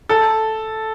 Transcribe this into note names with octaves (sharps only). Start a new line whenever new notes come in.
A4